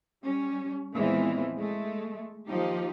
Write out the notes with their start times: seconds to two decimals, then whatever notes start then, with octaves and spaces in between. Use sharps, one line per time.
0.23 G3 C#4
0.94 E2 A#2 E3 F3 G#3 C4
1.57 G#3 A3
2.47 D#2 F3 D#4 G4